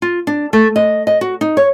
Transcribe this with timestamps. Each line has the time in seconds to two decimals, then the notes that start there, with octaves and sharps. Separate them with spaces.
0.02 F4
0.27 D4
0.53 A3
0.76 D#5
1.07 D#5
1.21 F#4
1.41 D#4
1.57 C#5